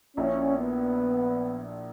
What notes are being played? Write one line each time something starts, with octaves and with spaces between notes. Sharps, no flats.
A#1 A#2 A#3 C#4 E4
B3